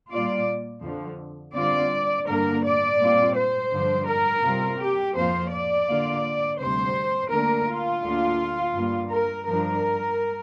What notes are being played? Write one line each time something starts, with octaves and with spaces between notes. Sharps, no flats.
A#2 G3 A#3 F4 D5
F2 D3 F3
D3 G3 C4 F4 D5
G2 D3 G3 A#3 D4 A#4
D5
A#2 G3 C4 F4
C5
G2 D3 F3 D4
A#4
C3 G3 C4 F4
G4
F2 F3 A#3 F4 C5
D5
D3 A#3 F4
D2 C3 G3 C5
D2 D3 A#3 D4 A#4
F4
D2 D3 A#3 D4
G2 G3 A#3
A#4
G2 F3 D4 A#4